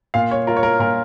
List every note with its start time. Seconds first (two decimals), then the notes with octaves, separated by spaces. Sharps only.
0.14 A#2 F5
0.31 C#5
0.47 F4 A#4
0.57 C#5
0.63 A#4
0.79 A#2 A#4